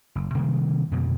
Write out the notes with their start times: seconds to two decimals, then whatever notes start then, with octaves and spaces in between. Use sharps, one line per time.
0.15 F#1
0.34 C3 D#3 G3 A#3
0.91 F2 B2 D3